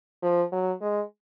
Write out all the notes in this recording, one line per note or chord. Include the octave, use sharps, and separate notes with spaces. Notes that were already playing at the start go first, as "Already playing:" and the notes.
F3
F#3
G#3